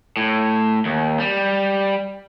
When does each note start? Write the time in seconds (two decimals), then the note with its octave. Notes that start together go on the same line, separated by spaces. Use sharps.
0.17 A2
0.85 D#2
1.20 G3